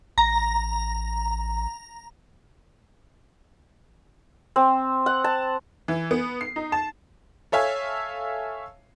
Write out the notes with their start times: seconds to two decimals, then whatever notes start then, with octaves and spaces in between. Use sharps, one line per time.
0.18 A1 A#5
4.56 C4
5.06 F#5
5.24 A5
5.88 E3
6.11 B3
6.41 C7
6.56 D#4
6.72 A5
7.52 A4 C#5 E5 F5 G#5